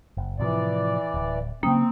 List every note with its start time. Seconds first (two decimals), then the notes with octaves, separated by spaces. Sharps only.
0.17 F#1
0.39 A2 C3 E3 F3 D5
1.14 D1
1.63 C#3 F#3 A#3 C4 C#4 G5 D#6